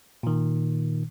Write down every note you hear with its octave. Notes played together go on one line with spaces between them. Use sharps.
A#2 D#3